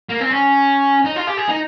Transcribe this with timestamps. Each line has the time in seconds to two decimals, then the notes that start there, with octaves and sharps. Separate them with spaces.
0.09 A#3
0.20 C4
0.31 C#4
1.05 D#4
1.16 F4
1.27 G4
1.37 G#4
1.48 D#4